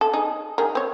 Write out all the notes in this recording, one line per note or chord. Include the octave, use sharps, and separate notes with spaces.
A4
D#4 G#4
D#3 G#4 A#4
C4 C#5